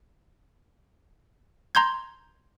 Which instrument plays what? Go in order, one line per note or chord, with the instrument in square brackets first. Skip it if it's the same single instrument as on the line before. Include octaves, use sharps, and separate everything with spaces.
[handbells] A#5 C6 G6 G#6